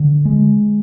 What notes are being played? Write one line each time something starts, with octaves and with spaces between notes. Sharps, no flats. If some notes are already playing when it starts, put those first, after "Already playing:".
Already playing: D3
G#3